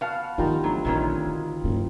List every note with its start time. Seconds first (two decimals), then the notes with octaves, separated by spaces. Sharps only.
0.01 B3 F#4 F5 A5
0.38 D#3 F3 B3 F4 G4 A#5
0.64 D2 F#3
0.85 A#1 C3 D#3 C#4
1.26 D3
1.64 F#1 G2